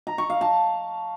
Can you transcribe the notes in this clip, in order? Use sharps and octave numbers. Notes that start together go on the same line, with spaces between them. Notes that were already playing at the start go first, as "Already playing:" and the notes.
A#5
C#6
F5
A5